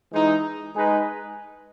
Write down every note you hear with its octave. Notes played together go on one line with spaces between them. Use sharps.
E3 G#3 D#4
G#3 D#4 G#4 B4